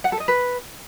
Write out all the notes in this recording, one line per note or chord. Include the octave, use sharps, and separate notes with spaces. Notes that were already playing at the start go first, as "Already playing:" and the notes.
F#5
A4
D#5
B4